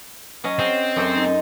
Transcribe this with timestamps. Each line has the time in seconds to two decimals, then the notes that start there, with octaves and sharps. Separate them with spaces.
0.44 F#3 C#4 D#5
0.59 C4 G#4
0.96 F#2 A4 C5
1.15 D#4